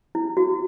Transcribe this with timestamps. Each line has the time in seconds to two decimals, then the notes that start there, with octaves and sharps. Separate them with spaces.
0.15 E4
0.37 F#4